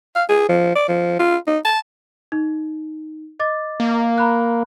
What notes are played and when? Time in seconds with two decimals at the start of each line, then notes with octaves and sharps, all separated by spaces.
0.16 F5
0.29 G#4
0.49 F3
0.76 D5
0.88 F3
1.19 F4
1.47 D#4
1.65 A5
2.32 D#4
3.40 D#5 D6 A6
3.80 A#3
4.18 A#5 B5 F#6